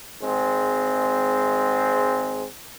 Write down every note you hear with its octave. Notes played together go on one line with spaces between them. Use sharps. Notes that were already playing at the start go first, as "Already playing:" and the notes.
G#1 G#3 C4